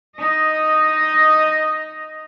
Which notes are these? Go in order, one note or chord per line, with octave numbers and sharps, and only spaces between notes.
D#4 D#5